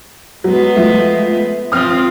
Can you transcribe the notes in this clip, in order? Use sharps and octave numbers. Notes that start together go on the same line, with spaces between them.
F#3 G#3 B3
F3 A3
F3 C4 F4 D#6 F6